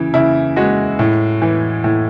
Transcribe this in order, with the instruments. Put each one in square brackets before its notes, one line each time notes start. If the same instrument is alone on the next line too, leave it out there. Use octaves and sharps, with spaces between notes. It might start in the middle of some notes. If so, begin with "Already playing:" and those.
Already playing: [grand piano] C#3 E3
C#3 E4
G#3 F#4
A2
E3
A2